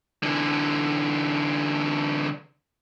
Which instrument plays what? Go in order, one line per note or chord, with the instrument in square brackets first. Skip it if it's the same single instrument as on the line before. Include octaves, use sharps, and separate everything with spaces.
[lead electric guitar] D3 E3